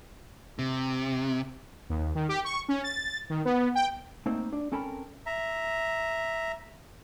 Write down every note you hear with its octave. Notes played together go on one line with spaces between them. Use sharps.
C3
D#2
D#3
G4
C#6
C#4
A6
D#3
B3
G5
A3 A#3 C4 D#4
D4
C4 C#4 A4 A#4 A5 B5
E5 A#5